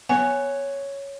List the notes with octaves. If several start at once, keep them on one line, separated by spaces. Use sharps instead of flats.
B3 C#5 G#5